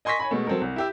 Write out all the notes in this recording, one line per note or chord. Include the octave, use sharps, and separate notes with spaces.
D#5 G#5 C6 C#6 A#6 B6
C#5 G#5 B5
B2 G#3 A3
F#3 C4 A4 A#4
C2
E4 G4 E5